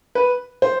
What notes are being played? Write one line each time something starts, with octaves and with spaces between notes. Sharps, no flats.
B4
C5